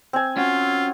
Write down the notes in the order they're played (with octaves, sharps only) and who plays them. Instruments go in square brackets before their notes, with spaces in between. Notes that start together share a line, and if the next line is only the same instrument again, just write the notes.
[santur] C4 G#5
[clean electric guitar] C#4 F#4 [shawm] F4